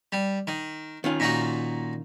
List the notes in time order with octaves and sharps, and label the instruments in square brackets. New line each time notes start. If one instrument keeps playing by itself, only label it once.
[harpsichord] G3
D#3
[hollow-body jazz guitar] D#3 C#4 F4
[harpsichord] A#2 D#4 F#4